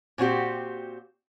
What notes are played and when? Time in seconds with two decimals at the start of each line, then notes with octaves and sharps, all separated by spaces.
0.18 A#2 C4 F#4 G4